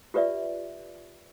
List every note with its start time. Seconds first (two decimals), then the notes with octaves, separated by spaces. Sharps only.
0.14 F4 G4 B4 D5 E5